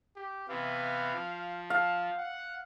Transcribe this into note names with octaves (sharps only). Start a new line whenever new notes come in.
G4
C3 E3 B3 F5
F3
F5 A5
F#5